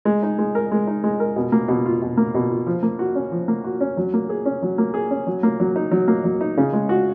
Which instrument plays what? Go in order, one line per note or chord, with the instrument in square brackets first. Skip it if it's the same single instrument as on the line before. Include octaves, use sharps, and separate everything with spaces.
[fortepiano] G#3
D#4
G#3
A#4
G#3
D#4
G#3
A#4
B2
A#3
B2
F4
B2
A#3
B2
F4
F3
A#3
F#4
C#4
F3
A#3
F#4
C#4
F#3
A#3
G#4
C#4
F#3
A#3
G#4
C#4
F#3
A#3
F#3
D#4
F#3
A#3
F#3
D#4
C#3
G#3
F#4